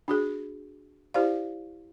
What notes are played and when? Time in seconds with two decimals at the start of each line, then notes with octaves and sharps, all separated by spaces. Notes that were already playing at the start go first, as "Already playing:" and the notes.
0.08 D4 F#4 G#4
1.14 E4 G4 C5 D5 F5